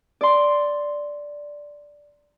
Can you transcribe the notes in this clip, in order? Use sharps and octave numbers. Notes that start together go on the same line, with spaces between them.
D5 C6